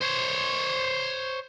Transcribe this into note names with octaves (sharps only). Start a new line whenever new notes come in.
C5 C#5